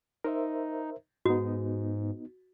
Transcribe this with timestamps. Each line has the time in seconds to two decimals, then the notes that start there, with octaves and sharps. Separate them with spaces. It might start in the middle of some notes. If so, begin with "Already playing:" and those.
0.24 D#4 A#4 C5 E5
1.26 G#2 B3 D#4 F#4